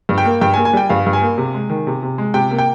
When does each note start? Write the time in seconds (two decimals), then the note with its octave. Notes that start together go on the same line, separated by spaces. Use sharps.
0.09 G2
0.18 G5
0.25 A#3
0.41 G2 G5
0.54 G#5
0.57 A#3
0.65 G#5
0.73 G3 G5
0.89 G2 F5
1.06 G2
1.13 G#5
1.22 A#3
1.38 C3
1.54 G#3
1.70 D#3
1.87 C3
2.03 C3
2.18 G#3
2.34 C3 G5
2.51 A#3
2.58 G5